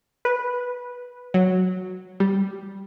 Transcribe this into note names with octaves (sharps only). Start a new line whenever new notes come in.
B4
F#3
G3